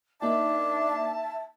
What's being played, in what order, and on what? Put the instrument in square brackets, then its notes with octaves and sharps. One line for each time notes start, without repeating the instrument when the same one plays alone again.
[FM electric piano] A#3 D#4 G5 [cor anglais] D4 [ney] E5 [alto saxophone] A5